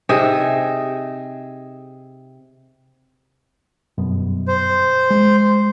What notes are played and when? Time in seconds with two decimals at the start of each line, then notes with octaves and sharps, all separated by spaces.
0.09 C3 D#4 G#4 E5
3.98 G1 F#2 B2
4.48 C5
5.10 G#3